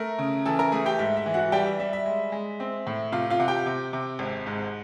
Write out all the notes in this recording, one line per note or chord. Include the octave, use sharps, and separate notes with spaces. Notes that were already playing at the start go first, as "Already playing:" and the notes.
Already playing: A3 A#4 A#5
C#3
E3 A4 A5
A#4 A#5
A3 G#4 G#5
G4 G5
G#2 E5
E5
E3
F#4 F#5
G3 G4 G5
E5
G3 E5
E5
G#3
G#3
C4
A2
C3 F4 F5
F4 F5
C3 F#5
G4 G5
C3
C3
G#1
G#2